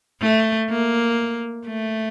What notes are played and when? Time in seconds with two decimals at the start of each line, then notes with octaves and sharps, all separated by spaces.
0.22 A3
0.70 A#3
1.67 A3